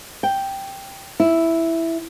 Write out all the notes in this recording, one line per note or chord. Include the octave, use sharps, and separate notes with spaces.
G5
E4